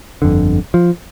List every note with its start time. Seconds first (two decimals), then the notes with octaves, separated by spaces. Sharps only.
0.22 G1 F2 D3
0.74 F3